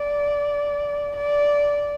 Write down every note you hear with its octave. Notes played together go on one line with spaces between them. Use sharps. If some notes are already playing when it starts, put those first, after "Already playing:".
Already playing: D5
D5